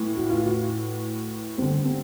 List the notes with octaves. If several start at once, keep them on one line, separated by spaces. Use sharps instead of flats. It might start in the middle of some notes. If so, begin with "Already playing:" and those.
Already playing: A2 E3
F#4
F4
F#4
G2 D3 C4
C4